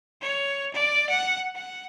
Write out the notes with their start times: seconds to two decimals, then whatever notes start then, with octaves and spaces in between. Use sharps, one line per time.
0.22 C#5
0.74 D5
1.10 F#5
1.55 F#5